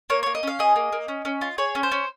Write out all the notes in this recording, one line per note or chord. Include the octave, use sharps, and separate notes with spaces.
A#3 C#5
A#3 C#5
D#5
C#4 F5
G#4 D#5
A#3
A#3
C#4
C#4
F4
G#4 C#5
C#4
C5
C#4